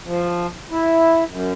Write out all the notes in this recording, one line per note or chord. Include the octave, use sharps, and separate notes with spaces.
F3
E4
F#2